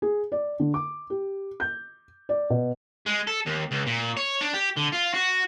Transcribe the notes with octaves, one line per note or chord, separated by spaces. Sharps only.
G#4
D5
D3
D6
G4
G6
D5
B2
G#3
A4
D#2
C#2
A#2
C#5
D4
G4
D3
F4
F#4